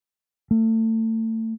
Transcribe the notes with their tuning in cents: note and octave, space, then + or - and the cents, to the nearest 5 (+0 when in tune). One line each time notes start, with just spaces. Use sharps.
A3 +30